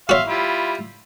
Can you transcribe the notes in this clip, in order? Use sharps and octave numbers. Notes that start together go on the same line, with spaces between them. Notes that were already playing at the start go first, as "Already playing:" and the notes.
F#4 C#5 E5 F5 C6
G3 E4 F4